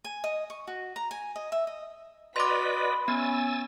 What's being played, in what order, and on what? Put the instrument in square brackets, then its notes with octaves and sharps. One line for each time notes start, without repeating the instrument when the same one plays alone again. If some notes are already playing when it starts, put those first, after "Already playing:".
[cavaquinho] G#5
D#5
C#6
F#4
A#5
G#5
D#5
E5
D#5
[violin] F#4 B6 [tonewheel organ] B4 D5 D#5 [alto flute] B5 [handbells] C6 D6
[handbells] B3 [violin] C#4 [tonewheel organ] G#5 E6 A6